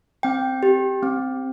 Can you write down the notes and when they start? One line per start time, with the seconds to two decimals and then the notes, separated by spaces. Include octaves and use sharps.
0.23 C4 G5
0.63 G4
1.03 C4